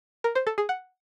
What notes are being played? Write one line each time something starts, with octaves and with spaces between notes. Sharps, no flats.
A#4
C5
A4
G#4
F#5